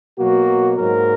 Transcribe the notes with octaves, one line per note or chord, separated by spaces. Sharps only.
B2 F#3 A#3 F#4
G#2 F#3 A#3 A#4